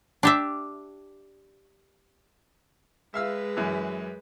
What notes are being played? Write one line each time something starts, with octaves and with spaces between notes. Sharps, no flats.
D4 G4 E5
G#3 B4 E5 F5 E6
F#2 E3